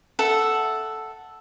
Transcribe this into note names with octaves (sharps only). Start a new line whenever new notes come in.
A4 E5 F#5